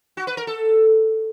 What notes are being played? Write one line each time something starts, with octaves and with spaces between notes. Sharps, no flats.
F#4
B4
A#4
A4